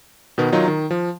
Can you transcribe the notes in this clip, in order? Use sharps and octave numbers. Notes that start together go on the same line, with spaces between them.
B2 D#3 B3
D#3 F#3 D#4 F4
D#3
F3